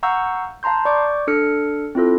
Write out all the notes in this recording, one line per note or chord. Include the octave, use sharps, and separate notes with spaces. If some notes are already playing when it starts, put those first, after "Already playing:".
F5 F#5 A#5 C#6 E6 G6
F5 A5 A#5 C6 G6
D5 C#6 D6 G6
D4 A4 F6 C#7
C4 E4 F4 A4